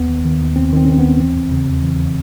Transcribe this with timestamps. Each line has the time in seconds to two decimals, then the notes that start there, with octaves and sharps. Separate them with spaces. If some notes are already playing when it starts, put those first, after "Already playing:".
Already playing: D#2 B3
0.09 D#3
0.25 D#3
0.41 D#2
0.56 D#2 C4
0.72 D#3 C4
0.85 C#4
0.88 D#3 C4
0.98 B3
1.04 D#2
1.19 E3 C4
1.36 E2
1.51 C#3
1.67 E2
1.83 E3